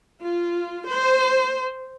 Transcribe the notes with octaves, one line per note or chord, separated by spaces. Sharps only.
F4
C5